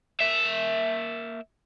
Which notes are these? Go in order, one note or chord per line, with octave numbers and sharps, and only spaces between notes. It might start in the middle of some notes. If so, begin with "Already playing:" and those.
A#3 E5